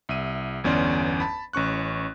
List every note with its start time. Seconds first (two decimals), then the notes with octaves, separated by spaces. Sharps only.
0.09 C2 E5 D#7
0.64 G1 E2 C#4 D5 C6
1.20 A5 B5
1.53 A1 C#4 C#6 F#6